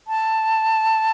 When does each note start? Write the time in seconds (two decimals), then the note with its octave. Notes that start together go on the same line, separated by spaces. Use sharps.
0.08 A5